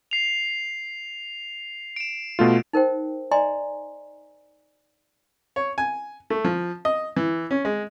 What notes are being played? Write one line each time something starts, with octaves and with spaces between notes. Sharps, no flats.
C7 F7
D7 E7
B2 A3 F4
D#4 A#4 C5 G5
D5 D#5 G#5 A#5 C6
C#5
G#5
A3
F3
D#5
E3
C#4
G#3